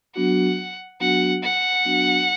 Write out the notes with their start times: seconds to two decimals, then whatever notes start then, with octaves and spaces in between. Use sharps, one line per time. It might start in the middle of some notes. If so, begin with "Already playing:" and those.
0.15 F#3 B3 D4 F#4 F#5
1.00 F#3 B3 D4 F#4 F#5
1.43 F#5
1.85 F#3 B3 D4 F#4